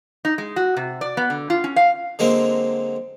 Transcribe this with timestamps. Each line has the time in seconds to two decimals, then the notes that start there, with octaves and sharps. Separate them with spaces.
0.25 D#4
0.38 G#3
0.56 F#4
0.77 C3
1.01 D5
1.17 B3
1.30 D3
1.50 F4
1.64 C#4
1.76 F5
2.19 D3 F#3 G#3 A#3 C4